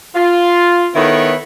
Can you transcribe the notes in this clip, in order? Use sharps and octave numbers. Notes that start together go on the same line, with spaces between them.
F4
D#3 B3 E4 A4 C#5 B5